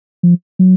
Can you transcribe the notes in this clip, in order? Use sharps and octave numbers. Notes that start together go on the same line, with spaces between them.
F3
F#3